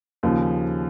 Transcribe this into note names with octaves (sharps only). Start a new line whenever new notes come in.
D#2 C#3 F3